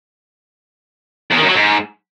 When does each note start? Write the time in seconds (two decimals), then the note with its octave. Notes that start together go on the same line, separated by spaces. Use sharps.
1.31 E2
1.37 D#3
1.43 F#2
1.49 F#3
1.55 G#2